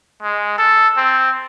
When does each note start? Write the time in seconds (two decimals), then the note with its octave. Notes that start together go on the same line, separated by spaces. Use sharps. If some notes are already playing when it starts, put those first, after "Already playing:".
0.23 G#3
0.58 A4
0.97 C4